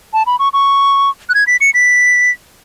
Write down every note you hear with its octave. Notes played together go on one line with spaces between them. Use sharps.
A5
B5
C#6
C#6
F#6
G#6
B6
C#7
B6